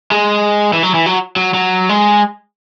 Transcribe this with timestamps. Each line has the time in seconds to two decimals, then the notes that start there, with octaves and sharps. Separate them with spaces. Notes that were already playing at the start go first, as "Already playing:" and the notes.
0.11 G#3
0.73 E3
0.83 F#3
0.94 E3
1.06 F#3
1.36 F#3
1.54 F#3
1.89 G#3